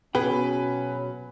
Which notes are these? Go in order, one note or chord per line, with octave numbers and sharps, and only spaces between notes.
B2 F#3 C#4 G#4 B4 G5